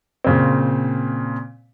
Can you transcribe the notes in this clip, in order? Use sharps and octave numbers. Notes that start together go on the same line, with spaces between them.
A#2 C#3 C4